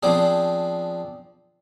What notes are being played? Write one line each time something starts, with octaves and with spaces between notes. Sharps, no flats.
F3 B3 C4 D4 G#4